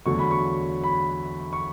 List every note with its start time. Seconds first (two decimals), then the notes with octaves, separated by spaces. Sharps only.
0.06 E2 D3 F#3 A3 C#6
0.19 B5
0.31 C#6
0.84 B5
1.53 C#6